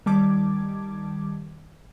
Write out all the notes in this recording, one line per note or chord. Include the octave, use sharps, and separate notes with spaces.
D#3 G3 A5 D6 G#6